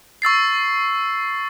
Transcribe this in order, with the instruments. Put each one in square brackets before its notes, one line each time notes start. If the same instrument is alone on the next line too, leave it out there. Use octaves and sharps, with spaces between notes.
[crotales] C#6 E6 A6 C7